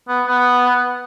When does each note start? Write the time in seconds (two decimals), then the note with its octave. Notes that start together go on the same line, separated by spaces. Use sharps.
0.09 B3
0.27 B3